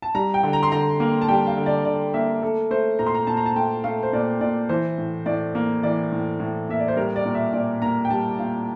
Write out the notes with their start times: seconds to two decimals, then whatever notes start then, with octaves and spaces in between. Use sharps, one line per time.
0.02 A5
0.15 G3 A#5
0.34 G5
0.43 D3
0.53 A#5
0.63 C6
0.72 D3 A#5
1.00 A#3
1.21 A5
1.28 G3 G5
1.47 F5
1.57 D3
1.66 D5
1.85 D3 D5
2.14 A#3 E5
2.42 A3 A4
2.71 A3 C5
2.99 A#2 A#5
3.07 C6
3.14 A#5
3.27 A#2 A5
3.37 A#5
3.46 A5
3.56 A3 G5
3.84 A3 F5
4.03 C5
4.13 A#2 D5
4.41 A#2 D5
4.69 E3 C5
4.98 A2
5.26 A2 D5
5.55 A#3
5.83 E3 D5
6.12 A2
6.40 A2
6.69 A#3 E5
6.79 D5
6.88 C5
6.96 G3 A#4
7.16 D5
7.25 A#2
7.34 E5
7.53 A#2 D5
7.82 A#3 A#5
8.05 G5
8.10 G3 A5
8.39 A#2 F5